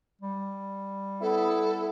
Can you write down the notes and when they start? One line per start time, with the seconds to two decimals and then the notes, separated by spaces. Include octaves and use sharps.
0.21 G3
1.22 B3 E4 A4